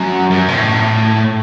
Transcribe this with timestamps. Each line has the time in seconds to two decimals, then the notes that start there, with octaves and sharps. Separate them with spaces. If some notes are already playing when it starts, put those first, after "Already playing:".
Already playing: F#2
0.30 F#2
0.48 B2
0.53 A2